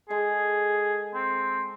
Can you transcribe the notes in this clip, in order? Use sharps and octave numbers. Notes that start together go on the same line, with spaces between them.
G#3 G#4 A4
C4